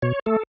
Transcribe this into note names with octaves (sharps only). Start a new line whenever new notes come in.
B2 C#5
A3 A4